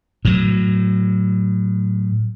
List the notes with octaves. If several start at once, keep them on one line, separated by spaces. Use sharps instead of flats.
A2 F#3